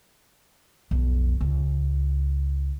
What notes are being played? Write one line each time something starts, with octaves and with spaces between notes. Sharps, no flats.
B1 F2
C#2